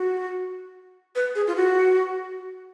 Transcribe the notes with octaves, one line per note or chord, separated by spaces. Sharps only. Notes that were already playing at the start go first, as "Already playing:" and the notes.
Already playing: F#4
B4
G#4
F4
F#4